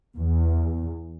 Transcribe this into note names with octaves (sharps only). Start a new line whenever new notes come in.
E2